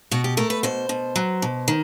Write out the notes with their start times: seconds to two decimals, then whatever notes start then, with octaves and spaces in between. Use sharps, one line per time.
0.11 B2 F#4
0.24 G4
0.37 A3 A#4
0.50 B4
0.63 B2 C5
0.89 B2
1.16 F#3
1.42 B2
1.68 D#3